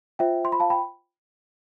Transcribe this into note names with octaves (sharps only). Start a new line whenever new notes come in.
F4 C5 E5 G5
C6
B5
F5 A5
G5 B5